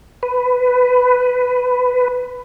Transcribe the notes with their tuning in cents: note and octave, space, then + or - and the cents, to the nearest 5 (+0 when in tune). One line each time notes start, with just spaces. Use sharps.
B4 +15